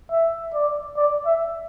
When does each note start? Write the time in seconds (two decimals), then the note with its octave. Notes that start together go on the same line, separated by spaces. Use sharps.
0.11 E5
0.54 D5
0.97 D5
1.26 E5